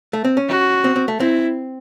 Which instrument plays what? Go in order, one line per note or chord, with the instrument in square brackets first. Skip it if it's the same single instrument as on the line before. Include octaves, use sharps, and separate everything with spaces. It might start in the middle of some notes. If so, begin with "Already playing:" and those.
[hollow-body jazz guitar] A3
C4
C#4
[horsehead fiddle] F#4
[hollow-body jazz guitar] C4
C4
A3
[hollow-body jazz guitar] C4 [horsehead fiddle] E4